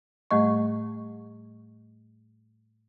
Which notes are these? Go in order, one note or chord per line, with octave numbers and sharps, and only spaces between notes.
A2 G3 A3 D#5 C#6